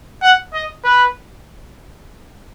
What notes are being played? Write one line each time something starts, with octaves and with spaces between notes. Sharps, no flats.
F#5
D#5
B4